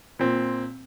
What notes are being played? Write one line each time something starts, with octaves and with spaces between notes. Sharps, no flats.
A#2 C4